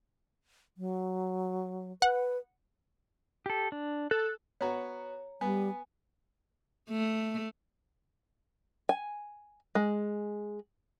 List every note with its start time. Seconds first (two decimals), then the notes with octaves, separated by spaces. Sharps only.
0.77 F#3
2.02 B4 F#5
3.46 G4 A4
3.72 D4
4.11 A4 F#6
4.61 B3 F#4 C#5 A#5
5.41 G3 B3 G#5
6.90 A3
8.89 G#5
9.75 G#3